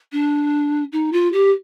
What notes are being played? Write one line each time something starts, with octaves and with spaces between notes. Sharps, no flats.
D4
D#4
F4
G4